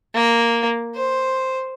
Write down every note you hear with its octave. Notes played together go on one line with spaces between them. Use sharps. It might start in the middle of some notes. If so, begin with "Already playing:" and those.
A#3
C5